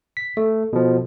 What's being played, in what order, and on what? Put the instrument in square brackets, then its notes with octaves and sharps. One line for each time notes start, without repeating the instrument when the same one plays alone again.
[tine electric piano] B6
[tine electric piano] A3 [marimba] A4
[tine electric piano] B2 F3